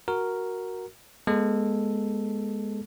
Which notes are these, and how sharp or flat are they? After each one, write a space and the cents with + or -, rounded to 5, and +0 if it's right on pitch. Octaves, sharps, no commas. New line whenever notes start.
F#4 +0 A#4 +0
G#3 +0 B3 -40 A4 +0